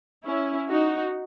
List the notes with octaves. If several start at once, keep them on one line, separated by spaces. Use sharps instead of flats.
C#4 E4
D#4 F#4